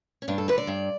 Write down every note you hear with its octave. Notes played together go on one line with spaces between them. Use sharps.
C#4
G2 D4
A4
D3 B4
D5
G2